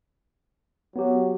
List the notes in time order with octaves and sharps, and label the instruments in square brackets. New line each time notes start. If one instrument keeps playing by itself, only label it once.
[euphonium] F#3 [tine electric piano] B3 G4